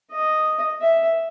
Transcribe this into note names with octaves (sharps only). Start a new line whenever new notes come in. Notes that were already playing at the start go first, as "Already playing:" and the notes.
D#5
E5